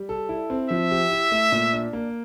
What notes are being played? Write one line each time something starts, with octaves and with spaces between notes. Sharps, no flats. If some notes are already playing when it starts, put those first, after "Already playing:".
Already playing: G3
A4
E4
C4
F3 E5
G4
E4
A3
A#2
D4
A#3